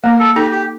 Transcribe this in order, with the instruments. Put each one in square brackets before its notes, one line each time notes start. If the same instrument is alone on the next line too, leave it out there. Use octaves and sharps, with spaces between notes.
[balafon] A#3 [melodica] A#4
[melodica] A4
[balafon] D#4 A4 [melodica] G4
[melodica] G4